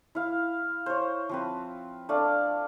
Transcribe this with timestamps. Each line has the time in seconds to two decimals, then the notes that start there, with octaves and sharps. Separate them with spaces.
0.15 E4 F5
0.86 C5 C#5
1.29 F3 C4 B4
2.09 A3 D4 D5 F5